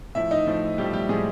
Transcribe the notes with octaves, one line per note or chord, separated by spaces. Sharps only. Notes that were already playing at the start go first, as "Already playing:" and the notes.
A2 F3 E4 E5
D#4 D#5
A2 F3
A2 F3 G3 G4
G3 G4
A2 F3 G#3 G#4